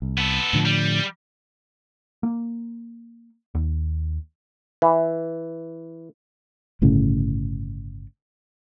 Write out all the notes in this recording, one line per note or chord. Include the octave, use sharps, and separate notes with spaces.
C2
B3 A4
A2 D3 F3
G3
A#3
D#2
E3
G1 A2 C#3